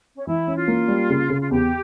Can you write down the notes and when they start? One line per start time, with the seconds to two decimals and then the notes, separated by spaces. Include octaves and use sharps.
0.16 C#4
0.27 E3 E4
0.47 C#4
0.57 F4
0.68 A#3
0.88 G3
1.10 C#3
1.30 C#3
1.41 F4
1.51 E2 G4